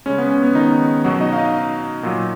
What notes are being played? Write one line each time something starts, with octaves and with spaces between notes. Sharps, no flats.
C#3 G#3 C#4
B3
C#4
B3
D#3 D#4
B2 F#3 F#4
D#4 D#5
F5
D#4 D#5
A#2 F#3